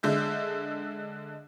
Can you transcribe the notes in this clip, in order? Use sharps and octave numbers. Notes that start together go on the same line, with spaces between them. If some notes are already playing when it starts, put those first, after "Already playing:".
D3 G#3 E5 G6